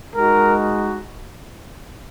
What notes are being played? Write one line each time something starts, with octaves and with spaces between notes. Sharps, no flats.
G#3 D#4 F#4 A#4